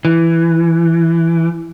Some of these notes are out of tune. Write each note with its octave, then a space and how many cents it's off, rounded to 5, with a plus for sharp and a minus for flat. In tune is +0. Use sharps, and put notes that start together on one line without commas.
E3 +10